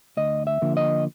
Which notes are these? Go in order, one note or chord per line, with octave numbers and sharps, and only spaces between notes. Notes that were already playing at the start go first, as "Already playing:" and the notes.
D2 D#5
E5
D3 F3 A#3
D#5